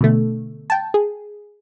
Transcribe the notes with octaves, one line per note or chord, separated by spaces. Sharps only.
B2 D3 A3
G5 A5
G#4